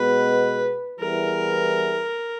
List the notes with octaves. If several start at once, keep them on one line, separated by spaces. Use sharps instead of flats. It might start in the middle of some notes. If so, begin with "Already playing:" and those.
Already playing: B2 G#3 B3 B4
E3 G3 B3 E4 G#4 A#4